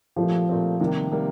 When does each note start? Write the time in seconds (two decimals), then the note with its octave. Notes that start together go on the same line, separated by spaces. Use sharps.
0.16 A#2 F3 A3 C4 G4
0.49 A#2 A3 C4 G4
0.80 C3 D#3 G3 A#3
1.11 C3 G3 A#3